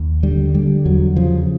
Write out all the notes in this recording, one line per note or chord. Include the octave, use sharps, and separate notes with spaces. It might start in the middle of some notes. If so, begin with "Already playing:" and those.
Already playing: D#2
D3 G3
D3 G3
E2 F#3
C#3 F3